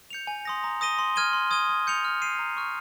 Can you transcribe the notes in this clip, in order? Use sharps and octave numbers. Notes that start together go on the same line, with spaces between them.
G6 C#7 F7
G#5
C6 D#6 A#6
A#5
D#6 A#6 D#7 G7
C6
F6 G#6 D#7 G7
C6
D#6 G#6 D#7 G7
D#6
G6 C#7 F7
F6
C7 D#7
A#5
C#6 F6